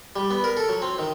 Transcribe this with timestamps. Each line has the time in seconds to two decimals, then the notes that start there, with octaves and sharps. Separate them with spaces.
0.16 G3
0.31 B3
0.44 A#4
0.57 A4
0.69 F#3
0.82 C4
0.99 D#3